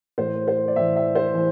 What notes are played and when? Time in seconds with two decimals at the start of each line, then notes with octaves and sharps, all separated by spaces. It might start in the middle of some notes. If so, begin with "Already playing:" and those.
0.18 A2 E3 C5
0.48 C5
0.68 D5
0.76 A2 E3 E5
0.96 E5
1.15 C5
1.35 E3